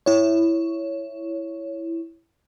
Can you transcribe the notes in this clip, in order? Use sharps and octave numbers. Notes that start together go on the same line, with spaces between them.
E4 C#5